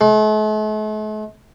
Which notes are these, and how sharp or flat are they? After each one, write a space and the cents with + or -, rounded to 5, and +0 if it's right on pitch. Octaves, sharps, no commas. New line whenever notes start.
A3 -45